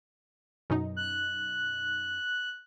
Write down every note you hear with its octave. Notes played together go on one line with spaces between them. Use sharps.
F#2 B2 D#4
F#6